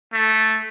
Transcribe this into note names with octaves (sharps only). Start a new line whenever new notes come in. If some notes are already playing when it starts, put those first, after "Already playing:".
A3